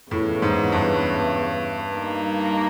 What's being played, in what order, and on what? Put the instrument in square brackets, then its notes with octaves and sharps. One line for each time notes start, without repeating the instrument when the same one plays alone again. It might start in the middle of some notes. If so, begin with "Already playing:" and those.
[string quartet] E2 C#3 E3 [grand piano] A2
[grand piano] G#2
G2
[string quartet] G3 A#3 D#4